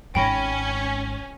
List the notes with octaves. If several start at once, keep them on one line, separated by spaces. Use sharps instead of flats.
G#1 G#2 C#4 G5 B5 A#6